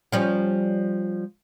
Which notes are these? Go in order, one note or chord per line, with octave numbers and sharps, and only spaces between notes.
F3 G3 C#4